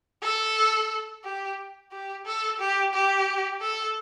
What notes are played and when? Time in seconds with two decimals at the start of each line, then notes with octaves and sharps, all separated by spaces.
0.22 A4
1.24 G4
1.92 G4
2.26 A4
2.59 G4
2.94 G4
3.61 A4